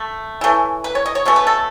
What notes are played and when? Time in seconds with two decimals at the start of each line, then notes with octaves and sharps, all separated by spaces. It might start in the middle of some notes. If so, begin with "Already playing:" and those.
Already playing: A3
0.41 E3 A3 C#4
0.84 B4
0.95 C#5
1.06 D#5
1.15 C#5
1.25 B2 A3 C#4 C#5
1.36 B4
1.47 A4